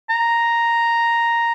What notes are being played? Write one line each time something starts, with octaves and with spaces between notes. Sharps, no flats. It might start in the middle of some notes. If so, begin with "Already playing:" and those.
A#5